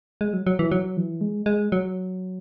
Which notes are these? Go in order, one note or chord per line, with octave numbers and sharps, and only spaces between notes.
G#3
F#3
F#3
E3
F#3
E3
G#3
G#3
F#3